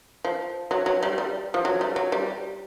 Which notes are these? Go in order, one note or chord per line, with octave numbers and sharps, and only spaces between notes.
F3
F#3
F#3
G3
G3
F3
F#3
G3
F#3
G3